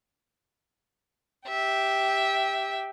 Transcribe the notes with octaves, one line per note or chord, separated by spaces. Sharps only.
G4 E5 G5